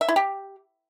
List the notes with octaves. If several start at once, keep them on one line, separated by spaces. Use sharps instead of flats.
E5
E4
G4